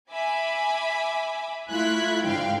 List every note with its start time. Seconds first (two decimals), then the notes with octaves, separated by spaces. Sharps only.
0.11 E5 G#5 B5 D6
1.69 A3 E4 F4 F#6 G#6 B6
2.24 G#2 D3 F5 G5